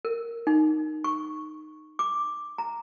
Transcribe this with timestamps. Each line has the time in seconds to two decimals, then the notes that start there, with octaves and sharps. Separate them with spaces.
0.05 A#4
0.47 D#4
1.04 C#6
1.99 D6
2.58 A#5